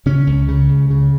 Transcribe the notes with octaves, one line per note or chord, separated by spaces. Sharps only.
C#3 C#4
C#2
C#3
C#2
C#3